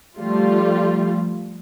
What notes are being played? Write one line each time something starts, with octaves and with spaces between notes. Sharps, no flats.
F3 G3 A3 F4